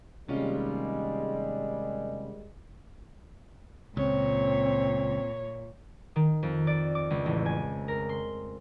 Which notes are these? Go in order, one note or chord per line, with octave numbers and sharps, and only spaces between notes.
D#2 C3 G3 G#3 C#4 F4
C#2 A#2 C4 C#5
D#3
F2
D5
D6
C#2
A1
G#5
A#4
C6